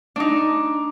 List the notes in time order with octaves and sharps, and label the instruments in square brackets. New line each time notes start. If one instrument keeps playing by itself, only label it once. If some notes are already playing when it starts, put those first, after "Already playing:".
[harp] D4 D#4